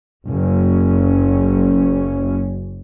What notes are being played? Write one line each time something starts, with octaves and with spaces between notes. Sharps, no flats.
F#1 C#4